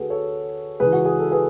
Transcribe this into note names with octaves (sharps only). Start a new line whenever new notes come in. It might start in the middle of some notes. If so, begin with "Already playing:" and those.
Already playing: D2 D3 F#4 G#4 A4 B4
A4 C#5
C#2 C#3 E3 G#4 B4
F#4
G#4
A4
G#4 B4